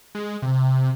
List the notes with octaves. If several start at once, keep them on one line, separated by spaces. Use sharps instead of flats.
G#3
C3